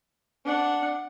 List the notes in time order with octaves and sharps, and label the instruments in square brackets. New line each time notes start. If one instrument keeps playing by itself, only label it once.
[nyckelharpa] D4 F#5